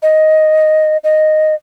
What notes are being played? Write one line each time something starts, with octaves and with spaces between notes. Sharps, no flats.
D#5
D#5